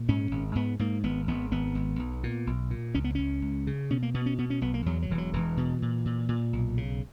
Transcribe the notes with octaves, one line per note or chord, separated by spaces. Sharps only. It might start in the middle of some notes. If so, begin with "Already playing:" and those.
Already playing: A#2
G#2 C#4
G#1
G#2 B3
G#2 A#3
G#1 B3
G#1 B3
G#1 B3
G#1
B1
A#2
B1
A#2
C#2 C#4
B3
C#2 C#4
C#2
C#3
B2 C#4
A#3
B2 B3
C#4
B2 B3
C#4
B1 B3
A#3
E2 F#3
F#3
E1 E3
F#3
E1 E3
B2
A#2
A#2
A#2
B1
C#3